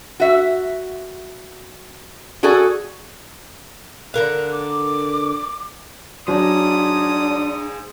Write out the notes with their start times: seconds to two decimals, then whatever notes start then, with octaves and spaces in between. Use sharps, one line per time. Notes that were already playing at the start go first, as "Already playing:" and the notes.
0.20 F#4 E5
2.43 F#4 G#4 A4 D5 G#5
4.14 D3 A#4 F5 F#6
4.52 D6
6.28 F#3 D4 G#4 C5 D#6